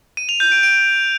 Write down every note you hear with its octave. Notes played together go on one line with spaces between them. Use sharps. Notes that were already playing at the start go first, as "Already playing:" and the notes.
D#7
F7
G6
D7
D7